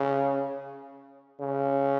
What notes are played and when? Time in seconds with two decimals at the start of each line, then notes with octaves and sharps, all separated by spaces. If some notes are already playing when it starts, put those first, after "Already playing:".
Already playing: C#3
1.41 C#3